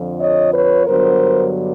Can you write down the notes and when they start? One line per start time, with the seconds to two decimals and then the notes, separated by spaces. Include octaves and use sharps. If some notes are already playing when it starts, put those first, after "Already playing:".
Already playing: F2 D3 F3
0.19 C#5 D#5
0.53 B4 C#5
0.87 G2 D3 F#3 B3 A#4 C5